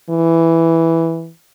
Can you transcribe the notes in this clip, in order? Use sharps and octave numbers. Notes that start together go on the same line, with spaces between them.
E3